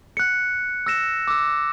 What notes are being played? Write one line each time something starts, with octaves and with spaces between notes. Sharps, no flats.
F#6 C#7
E6 A#6 E7
D6 E6